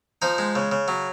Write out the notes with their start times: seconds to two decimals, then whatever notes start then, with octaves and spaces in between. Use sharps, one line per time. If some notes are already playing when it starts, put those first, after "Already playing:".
0.22 F3 D#4
0.38 G#3
0.55 C#3
0.72 C#3
0.88 F#3